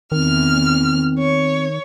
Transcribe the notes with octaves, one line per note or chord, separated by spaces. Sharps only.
E2 D#3 C4 F6
C#5